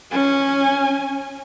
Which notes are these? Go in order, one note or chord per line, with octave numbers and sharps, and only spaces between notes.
C#4 G#5